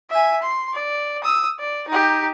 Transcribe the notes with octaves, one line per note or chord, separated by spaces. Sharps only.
E5 G#5
C6
D5
D#6 E6
D5
D#4 G4